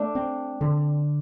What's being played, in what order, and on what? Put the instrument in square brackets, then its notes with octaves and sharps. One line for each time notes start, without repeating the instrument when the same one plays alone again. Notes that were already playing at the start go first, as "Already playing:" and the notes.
Already playing: [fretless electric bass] A3 [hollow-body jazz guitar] D4
[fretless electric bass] C4
D3